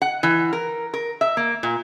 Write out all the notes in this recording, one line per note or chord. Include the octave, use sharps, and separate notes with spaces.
F#5
E3
A#4
A#4
E5
A#3
A#2